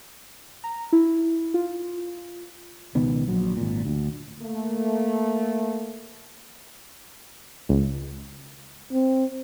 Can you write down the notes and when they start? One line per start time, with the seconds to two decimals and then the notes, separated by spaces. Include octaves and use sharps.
0.64 A#5
0.92 E4
1.54 F4
2.95 C#2 B2 D#3 B3
3.28 A#1 F#3
3.57 G#1 A#2
3.85 D2
4.42 A3 A#3
7.69 C#2
8.92 C4